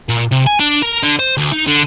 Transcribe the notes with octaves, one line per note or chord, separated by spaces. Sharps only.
A#2
C3
G#5
D4
A#4
D3
C5
D2
D#4
D3